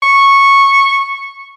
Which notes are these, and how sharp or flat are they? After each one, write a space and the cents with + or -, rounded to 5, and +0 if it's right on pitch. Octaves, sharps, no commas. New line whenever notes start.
C#6 -10